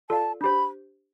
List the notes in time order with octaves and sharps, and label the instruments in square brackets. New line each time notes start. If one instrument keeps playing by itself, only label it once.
[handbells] F4 A4 D5 F5 [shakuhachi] A5
[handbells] D4 G4 C5 [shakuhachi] B5